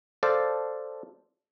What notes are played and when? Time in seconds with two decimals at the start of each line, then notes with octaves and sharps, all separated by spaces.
0.23 A4 C5 D5 F5 A5